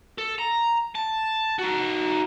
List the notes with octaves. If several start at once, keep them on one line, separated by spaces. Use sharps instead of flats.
A4
A#5
A5
D#4 F#4